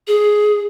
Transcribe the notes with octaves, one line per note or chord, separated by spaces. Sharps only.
G#4